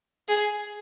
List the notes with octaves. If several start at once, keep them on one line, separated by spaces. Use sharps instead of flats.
G#4